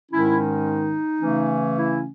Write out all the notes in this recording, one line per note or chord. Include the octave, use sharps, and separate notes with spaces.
G#2 D#3 G#3 C#4 E4
D#4
C#3 E3 A3 C#4
E4